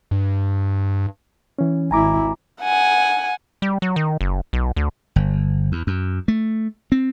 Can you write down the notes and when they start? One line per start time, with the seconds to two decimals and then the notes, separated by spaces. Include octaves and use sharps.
0.11 G2
1.59 E3 C#4
1.91 G#1 E4 G#5 A#5 D6
2.62 F#5 G#5
3.62 G3
3.82 F#3
3.96 D#3
4.21 F#1
4.53 B1
4.76 D2
5.16 G1
5.72 E2
5.87 F#2
6.28 A3
6.92 C4